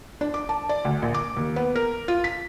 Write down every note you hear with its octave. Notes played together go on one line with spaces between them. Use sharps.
D4
D6
A5
D5
D2
A#1
D6
D#2
B3
A#4
F4
B6